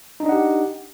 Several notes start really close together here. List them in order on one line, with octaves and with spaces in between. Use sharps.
D#4 D4 D#5 F#5 G4